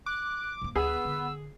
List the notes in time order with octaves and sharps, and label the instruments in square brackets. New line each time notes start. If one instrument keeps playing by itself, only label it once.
[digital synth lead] D6 [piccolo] F#6
[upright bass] G#2 A#3
[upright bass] D2 [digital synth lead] B3 [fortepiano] G#4 [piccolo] E6
[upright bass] D3